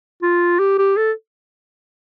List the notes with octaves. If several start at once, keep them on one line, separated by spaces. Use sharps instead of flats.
F4
G4
G4
A4